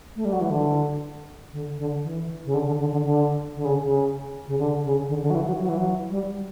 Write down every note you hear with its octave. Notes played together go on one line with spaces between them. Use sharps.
A3
G3
F#3
E3
D3
D3
D3
E3
C#3
D3
D3
D3
D3
D3
D3
C#3
C#3
C#3
D3
C#3
D3
D3
F#3
E3
F#3
F#3
E3
F#3
G3